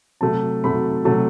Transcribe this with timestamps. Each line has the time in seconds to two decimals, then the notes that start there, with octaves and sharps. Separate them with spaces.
0.21 C3 F#3 A3 A5
0.64 C3 F#3 A3 B5
1.05 C3 F#3 A3 A5